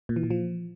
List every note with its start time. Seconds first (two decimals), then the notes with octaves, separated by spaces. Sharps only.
0.09 A#2
0.16 E3
0.23 A#2
0.31 F3